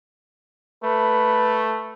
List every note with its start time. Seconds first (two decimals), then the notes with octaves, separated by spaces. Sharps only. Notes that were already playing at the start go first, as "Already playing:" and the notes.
0.84 A3 B4